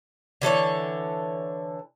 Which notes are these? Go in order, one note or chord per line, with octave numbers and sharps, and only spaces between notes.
D3 E3 A4 C#5